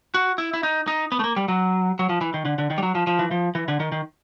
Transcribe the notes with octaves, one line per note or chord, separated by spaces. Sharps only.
F#4
E4
E4
D#4
D#4
B3
A3
A#3
G3
F#3
F#3
F3
E3
D#3
D3
D3
D#3
G3
F#3
F3
F3
E3
F3
E3
D3
D#3
D#3